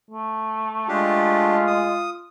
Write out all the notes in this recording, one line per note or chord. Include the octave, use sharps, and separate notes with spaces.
A3
G#3 D4 F4 G4
D#6